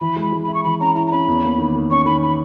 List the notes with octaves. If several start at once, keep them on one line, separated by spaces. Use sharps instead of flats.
E3 B5
G#3
B5
G#3
B5
E4
C#6
E3 B5
C#4 A#5
E4 A#5
A#5
C#4 B5
E2
A#3
D#3
D#3
C#4 C#6
D#3 B5
B5